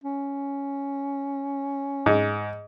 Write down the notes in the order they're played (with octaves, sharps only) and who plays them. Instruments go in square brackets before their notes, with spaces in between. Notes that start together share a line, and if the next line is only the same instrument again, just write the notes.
[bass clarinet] C#4
[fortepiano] G#2